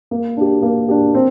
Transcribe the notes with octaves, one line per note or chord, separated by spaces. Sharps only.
A#3
D4 G4
A#3
D4 G4
C4